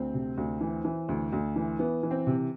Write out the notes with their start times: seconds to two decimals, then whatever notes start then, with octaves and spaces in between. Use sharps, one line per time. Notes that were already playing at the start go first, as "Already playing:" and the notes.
Already playing: D2 C4
0.14 C3
0.37 D2
0.61 E3
0.85 E3
1.09 D2
1.32 D2
1.56 E3
1.79 E3 B3
2.03 E3
2.11 C4
2.27 C3